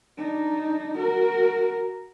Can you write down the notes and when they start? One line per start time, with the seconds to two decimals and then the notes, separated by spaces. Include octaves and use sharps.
0.18 D4 D#4
0.96 F#4 A#4